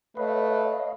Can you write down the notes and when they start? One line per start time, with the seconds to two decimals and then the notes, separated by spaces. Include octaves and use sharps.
0.17 A3 B4 C#5 D#5 F5